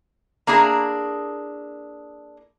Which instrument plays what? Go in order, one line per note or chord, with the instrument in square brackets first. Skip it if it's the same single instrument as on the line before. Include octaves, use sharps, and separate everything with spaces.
[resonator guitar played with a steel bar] A#3 D4 E4 G#4 A#4